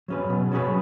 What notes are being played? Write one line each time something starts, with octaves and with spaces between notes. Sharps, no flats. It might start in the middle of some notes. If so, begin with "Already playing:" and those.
F#3 C#4 G#4 B4
B2
F#3 C#4 G#4 B4